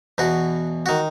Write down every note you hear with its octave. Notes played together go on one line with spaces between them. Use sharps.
E2 B2 F#4
D#3 F#4